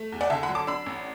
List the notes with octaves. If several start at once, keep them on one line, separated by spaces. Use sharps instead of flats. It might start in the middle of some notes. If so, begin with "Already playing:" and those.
Already playing: A3
E2
D5 F#5
D3 E5 A5
F#5 B5
F#3
A5 D6
D4 B5 E6
A1